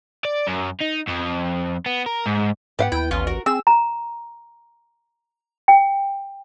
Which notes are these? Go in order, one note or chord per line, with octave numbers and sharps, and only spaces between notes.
D5
F#2
D#4
F2
B3
A#4
G#2
G#2 B3 G4 F5 F#5
D#2 E4 G5
A1 C#4 F4
F#4 A#4
C4 G#4 E6
A#5
G5